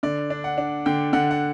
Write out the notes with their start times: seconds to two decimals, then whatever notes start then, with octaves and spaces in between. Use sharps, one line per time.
0.03 D3 D5
0.30 D4
0.44 F#5
0.58 D4
0.86 D3 G5
1.13 D3 F#5
1.31 F#5